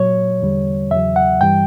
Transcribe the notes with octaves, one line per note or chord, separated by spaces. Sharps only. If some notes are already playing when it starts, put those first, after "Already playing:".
Already playing: A#2 F#3 C#5
E2 D3 G3
E2 C#3 F#3 E5
F#5
G2 E3 G3 G5